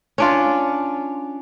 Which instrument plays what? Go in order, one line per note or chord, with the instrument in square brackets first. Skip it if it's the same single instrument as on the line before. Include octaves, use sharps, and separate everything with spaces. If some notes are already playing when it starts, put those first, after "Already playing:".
[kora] C#4 D4 F4